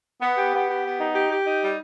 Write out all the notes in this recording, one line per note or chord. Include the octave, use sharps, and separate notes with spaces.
B3
G4
B3
G4
B3
D#4
G4
G4
D#4
G3